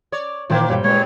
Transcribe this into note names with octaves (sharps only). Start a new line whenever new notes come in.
C#5 D5
A#2 D#3 E3 A#3 C5 G5
B1 G2 G3 C#5 G5
A#2 C#3 G#3 B4 C#5